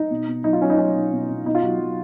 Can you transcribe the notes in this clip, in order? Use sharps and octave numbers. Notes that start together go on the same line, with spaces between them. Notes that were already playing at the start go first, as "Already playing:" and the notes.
Already playing: D#4
B2
B2
F#3 D#4
F4
F#3 C#4
D#4
F#3 C#4
B2
B2
B2
B2 D#4
F4
F#3 F#4
F#3